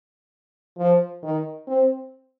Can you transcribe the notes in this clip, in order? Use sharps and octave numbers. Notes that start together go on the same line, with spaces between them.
F3
D#3
C4